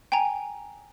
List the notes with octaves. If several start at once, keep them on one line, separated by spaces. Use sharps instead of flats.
G5 G#5 A#5